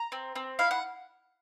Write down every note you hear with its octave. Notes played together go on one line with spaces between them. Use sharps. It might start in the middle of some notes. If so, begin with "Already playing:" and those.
Already playing: A#5
C4
C4
E4 F5
F#5